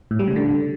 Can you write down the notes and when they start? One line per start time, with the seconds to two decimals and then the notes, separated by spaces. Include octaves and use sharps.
0.11 A2
0.19 G3
0.28 C#3
0.36 D3